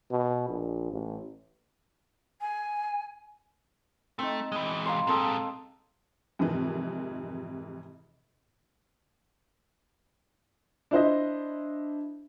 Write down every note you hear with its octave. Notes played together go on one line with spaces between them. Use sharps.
B2
A#1
A1
G#5
A3 C4 D#4
E3 G#3
F5 A#5 C6
A#2 G#3 C4 A4
F2 G#2 C3 D#3 E3
D4 E4 C5 D#5